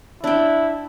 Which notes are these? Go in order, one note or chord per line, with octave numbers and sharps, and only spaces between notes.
D4 E4 G5